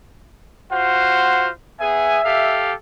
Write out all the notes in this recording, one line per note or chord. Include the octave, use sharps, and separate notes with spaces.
F4 F#4 C5 F#5
B3 G#4 E5 G#5
G4 A4 F5